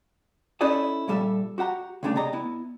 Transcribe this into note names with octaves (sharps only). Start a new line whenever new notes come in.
C#4 D#4 E4 A4 D5 D#5
G2 A#2 G3 A4 E5
F#4 G4 F#5 A#5
C#2 G2 C#3 A3 D4
C3 D5 D#5 A#5
B3 E4